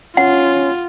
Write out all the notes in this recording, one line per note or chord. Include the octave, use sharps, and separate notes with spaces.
C#4 F4 F#5